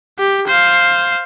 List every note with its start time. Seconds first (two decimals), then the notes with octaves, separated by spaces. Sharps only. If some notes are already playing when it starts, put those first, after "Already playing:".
0.19 G4
0.48 C5 F5